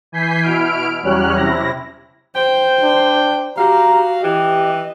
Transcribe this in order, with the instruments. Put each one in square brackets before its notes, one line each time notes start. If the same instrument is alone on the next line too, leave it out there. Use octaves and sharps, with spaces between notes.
[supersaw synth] E3 G#5 G6 B6 C7
B2 E4 F6 D7
E2 F#3 G3 C#4 F6 F#6
C3 E4 A#6
[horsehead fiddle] C5 [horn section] G5
[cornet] D4
[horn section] F#4 F5 [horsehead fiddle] G4 [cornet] A#5
[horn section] E3 [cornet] G4 [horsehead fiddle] D#5